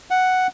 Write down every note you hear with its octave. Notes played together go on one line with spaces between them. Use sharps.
F#5